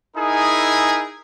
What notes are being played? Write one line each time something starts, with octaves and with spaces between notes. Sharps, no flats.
D#4 E4 G#4 A#4 G#5